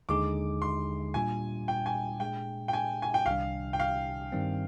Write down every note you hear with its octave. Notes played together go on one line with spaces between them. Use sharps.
D#2 D3 G#3 D#4 G#4 D6
C6
A#2 G3 D4 F4 G#5
G5
G#5
A#2 G#3 D4 G#4 G5
G5
G#5
G#5
G5
C2 C3 D#3 G3 D4 F5
G5
F5
G2 D#3 G3 C4